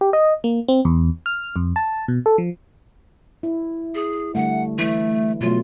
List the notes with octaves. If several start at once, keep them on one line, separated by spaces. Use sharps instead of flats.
G4
D#5
A#3
C4
E2
F6
F2
A5
B2
A4
F3
E4
G#4
D3 G3 A3 F#5
E3 A3 E4
B2 F#3 A3 F4